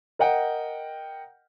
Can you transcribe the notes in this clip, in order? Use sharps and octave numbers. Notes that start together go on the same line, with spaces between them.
A#4 D#5 F#5 G5